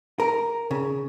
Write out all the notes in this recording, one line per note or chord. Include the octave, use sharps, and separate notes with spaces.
A#4
C#3